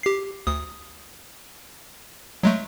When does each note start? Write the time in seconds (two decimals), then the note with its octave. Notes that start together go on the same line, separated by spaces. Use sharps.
0.03 G4 C7
0.47 D2 D#6
2.43 F#3 G#3 A3